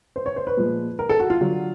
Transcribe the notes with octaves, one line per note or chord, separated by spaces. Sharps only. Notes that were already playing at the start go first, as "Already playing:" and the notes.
C5
C#5
C5
B4
A#2 F3 G#3
A#4
A4
F#4
F4
D3 F#3